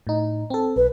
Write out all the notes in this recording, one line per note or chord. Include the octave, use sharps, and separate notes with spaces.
A2 D#4
C4 A4
B1 B4